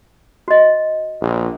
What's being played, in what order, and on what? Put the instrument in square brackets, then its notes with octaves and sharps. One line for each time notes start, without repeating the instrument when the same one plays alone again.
[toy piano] F#4 D#5
[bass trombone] A#1